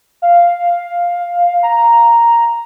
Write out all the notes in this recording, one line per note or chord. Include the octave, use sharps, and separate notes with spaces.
F5
A#5